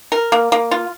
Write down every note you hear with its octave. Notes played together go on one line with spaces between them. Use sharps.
A#4
A#3
A#3
F4